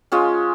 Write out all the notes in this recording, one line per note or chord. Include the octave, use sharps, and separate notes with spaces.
G#3 C#4 F4